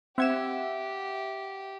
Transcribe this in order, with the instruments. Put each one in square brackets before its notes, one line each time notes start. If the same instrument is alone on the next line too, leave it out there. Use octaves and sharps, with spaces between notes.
[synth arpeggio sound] C4 G#6 E7 [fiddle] G4 [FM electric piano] E5 F#5